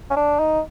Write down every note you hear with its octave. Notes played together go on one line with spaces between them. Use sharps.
C#4
D4
D#4